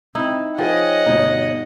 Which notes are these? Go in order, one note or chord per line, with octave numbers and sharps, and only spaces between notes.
C4 D#4 E4
F3 G#4 C5 C#5 D#5 F#5 G5
D2 G2 B2 D#4